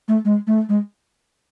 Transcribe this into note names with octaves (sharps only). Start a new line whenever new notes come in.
A3
G#3
A3
G#3